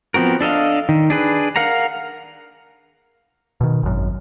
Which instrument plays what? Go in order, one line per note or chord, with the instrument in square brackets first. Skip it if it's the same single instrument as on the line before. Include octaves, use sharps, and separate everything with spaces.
[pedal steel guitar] F3 B3 C4 F#4 A#4
D4 A4 D#5 F5
D#3
D4 G#4 B4
A#4 F5 F#5 A#5
[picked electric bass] B2 D#3
G#1 F#2